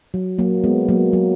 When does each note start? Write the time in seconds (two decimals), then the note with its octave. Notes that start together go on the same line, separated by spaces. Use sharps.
0.14 F#3
0.38 F#3 A#3
0.64 G#3 B3
0.89 F#3 A#3
1.13 F#3